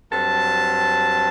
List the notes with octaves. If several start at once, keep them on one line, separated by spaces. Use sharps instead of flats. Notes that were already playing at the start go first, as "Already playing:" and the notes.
G2 F#3 C4 A5